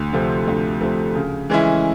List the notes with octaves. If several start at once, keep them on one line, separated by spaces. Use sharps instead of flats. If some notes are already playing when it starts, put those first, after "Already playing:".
Already playing: D2
C3 F3 A3
D2
C3 F3 A3
C#3
E3 G#3 C#4 E4